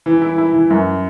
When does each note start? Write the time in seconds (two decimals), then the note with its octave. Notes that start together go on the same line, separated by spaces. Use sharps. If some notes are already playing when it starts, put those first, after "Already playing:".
0.06 E3
0.22 E4
0.38 E4
0.54 E3
0.70 F#2